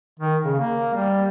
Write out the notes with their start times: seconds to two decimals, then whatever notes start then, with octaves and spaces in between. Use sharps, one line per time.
0.20 D#3
0.43 C#3
0.59 A#3
0.94 G3